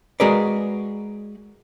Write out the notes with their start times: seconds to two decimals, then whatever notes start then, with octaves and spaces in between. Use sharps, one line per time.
0.20 G#3 F#4 G#4 A#4 B4 D5